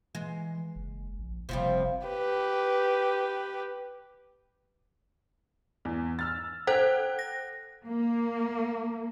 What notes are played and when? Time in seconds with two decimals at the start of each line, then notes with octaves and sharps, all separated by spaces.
0.15 E3 G#3
0.76 F#1
1.18 A#1
1.49 F#1 C3 F3 G3
2.07 G4 B4
5.85 E2
6.19 E6 F6 A6
6.67 A4 C5 F#5 G5 F#6
7.19 A#6
7.85 A#3